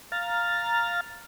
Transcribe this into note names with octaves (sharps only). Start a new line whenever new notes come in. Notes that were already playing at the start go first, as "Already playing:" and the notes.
F5 A#5 F6 A6